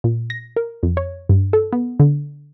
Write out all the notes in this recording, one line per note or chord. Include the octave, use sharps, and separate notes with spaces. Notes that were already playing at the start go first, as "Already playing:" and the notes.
A#2
A#6
A#4
F2
C#5
G2
A4
B3
D3